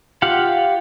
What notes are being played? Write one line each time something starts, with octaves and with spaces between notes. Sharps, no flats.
F4 G4 F5 F#5